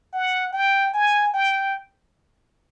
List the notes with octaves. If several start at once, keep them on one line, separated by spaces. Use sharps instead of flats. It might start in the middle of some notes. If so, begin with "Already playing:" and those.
F#5
G5
G#5
G5